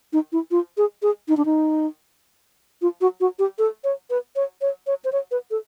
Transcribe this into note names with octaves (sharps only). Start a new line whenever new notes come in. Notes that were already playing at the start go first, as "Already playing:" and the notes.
D#4
E4
F4
G#4
G#4
D#4
D4
D#4
F4
F#4
F#4
G4
A4
C#5
B4
C#5
C#5
C#5
C5
C#5
B4
A4